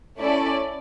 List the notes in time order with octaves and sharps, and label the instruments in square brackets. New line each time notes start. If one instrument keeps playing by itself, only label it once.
[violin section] A3 C#4 E4 A4 D5